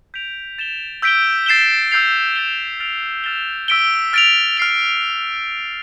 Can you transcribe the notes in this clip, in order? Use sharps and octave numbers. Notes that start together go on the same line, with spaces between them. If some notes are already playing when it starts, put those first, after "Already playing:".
G6 B6 D7 F7
A6 E7 G7
E6 G6 B6 D7 G7
A6 C7 E7 G7
E6 G6 C7 F7
A6 E7 G7
F6 A6 D7 F7
F6 A6 E7 G7
E6 B6 D7 G7
F6 A6 D7 F7
F6 C7 F7